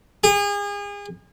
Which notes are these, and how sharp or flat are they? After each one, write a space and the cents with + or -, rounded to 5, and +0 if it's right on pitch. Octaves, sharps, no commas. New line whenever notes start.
G#4 -35